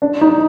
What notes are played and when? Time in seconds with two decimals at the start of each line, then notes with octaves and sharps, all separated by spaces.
0.02 D4
0.21 D#4